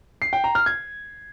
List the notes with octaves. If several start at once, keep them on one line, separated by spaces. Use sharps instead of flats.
C7
G5
A#5
F6
G#6